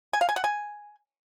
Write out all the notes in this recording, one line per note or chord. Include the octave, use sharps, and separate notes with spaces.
G#5
F5
G#5
F#5
G#5